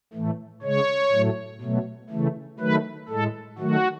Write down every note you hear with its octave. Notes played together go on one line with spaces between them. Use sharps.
A2 E3 A3
C#3 G#3 C#5
A2 F#3 A3
B2 F#3 A3
C#3 E3 A3
D#3 F#3 A3 B4
A2 G#3 A4
D#3 F#3 A3 F#4